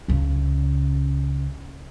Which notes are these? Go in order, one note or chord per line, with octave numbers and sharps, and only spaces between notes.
C#2 C#3